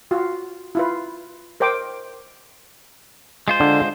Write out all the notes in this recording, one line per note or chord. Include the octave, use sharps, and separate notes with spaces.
F4 F#4
E4 F4 B4
A#4 C5 D#5 G5 D6
G#3 F4 C5
D3